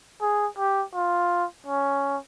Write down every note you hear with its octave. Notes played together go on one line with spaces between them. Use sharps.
G#4
G4
F4
C#4